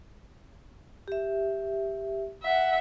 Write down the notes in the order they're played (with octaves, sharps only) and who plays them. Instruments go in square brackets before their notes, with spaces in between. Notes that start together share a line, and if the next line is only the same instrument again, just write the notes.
[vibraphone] G4 E5
[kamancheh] E5 F#5